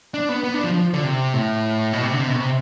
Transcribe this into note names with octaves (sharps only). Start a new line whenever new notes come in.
D4
B3
B3
D4
F3
F3
D3
C3
A2
B2
C3
D3
C3
B2
C3